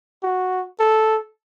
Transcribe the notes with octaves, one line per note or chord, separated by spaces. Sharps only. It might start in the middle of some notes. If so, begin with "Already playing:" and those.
F#4
A4